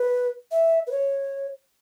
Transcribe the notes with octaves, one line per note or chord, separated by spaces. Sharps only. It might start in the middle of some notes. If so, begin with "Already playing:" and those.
Already playing: B4
E5
B4
C#5